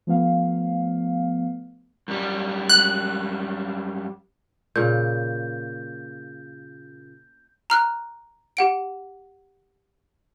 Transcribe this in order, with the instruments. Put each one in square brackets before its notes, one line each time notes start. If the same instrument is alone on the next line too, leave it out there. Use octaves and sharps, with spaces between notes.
[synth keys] F3 A3 B3 F5
[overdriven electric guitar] F#2 G3
[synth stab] F#6
[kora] A#2 C#3 [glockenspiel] G6
[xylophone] A#5 F6 F#6
G4 F#5 D7